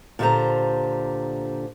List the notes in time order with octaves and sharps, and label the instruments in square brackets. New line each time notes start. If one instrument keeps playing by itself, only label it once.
[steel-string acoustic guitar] A#2 D3 D#4 G4 C5 A#5